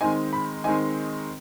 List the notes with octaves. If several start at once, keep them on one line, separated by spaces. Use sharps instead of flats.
D#3 G#3 C4 D#4 G#5
B5
D#3 G#3 C4 D#4 G#5